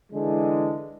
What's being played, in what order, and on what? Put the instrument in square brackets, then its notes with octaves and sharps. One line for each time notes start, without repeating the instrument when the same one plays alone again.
[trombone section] D3 E3 G#3